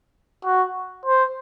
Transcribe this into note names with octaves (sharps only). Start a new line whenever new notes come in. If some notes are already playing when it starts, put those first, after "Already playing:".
F#4
C5